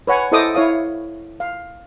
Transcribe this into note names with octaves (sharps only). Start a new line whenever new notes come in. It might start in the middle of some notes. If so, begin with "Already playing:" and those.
B4 C#5 F#5 G#5
E4 A4 C5 D#5 D6 D#6
E4 C#5 F5 D#6
F5